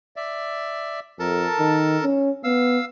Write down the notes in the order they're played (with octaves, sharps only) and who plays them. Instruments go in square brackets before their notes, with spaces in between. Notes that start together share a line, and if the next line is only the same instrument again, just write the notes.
[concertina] D5 E5
[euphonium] F2 [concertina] A4 A#4 A5
[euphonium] D#3
C#4
[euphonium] B3 [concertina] F5 E6